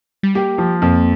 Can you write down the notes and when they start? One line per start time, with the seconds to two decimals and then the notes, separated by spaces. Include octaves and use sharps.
0.23 G3
0.35 A#3 G4
0.58 F3
0.82 F2 A#3